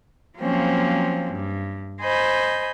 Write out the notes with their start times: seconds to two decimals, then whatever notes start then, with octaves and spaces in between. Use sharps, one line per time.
0.38 F3 F#3 A#3 C4 C#4
1.31 G2
2.00 C5 D#5 G#5 B5 G6